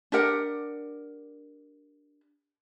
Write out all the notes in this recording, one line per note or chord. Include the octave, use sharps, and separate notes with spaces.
D4 G4 A#4 F#5